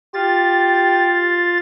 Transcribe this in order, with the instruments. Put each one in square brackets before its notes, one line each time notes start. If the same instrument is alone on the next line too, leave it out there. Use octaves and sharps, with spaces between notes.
[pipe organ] F4 A6 [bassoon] G4